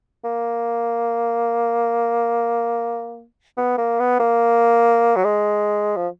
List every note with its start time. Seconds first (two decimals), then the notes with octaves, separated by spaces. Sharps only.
0.24 A#3
3.57 B3
3.78 A#3
4.00 B3
4.19 A#3
5.16 F#3
5.24 G#3
5.96 F3